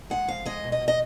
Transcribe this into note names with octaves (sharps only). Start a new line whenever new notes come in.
G#3 F#5
F2 F5
G#3 D#5
B2
D#5
B2
D#5